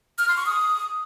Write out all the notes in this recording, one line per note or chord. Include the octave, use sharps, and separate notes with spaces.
F6
C6
C#6
D#6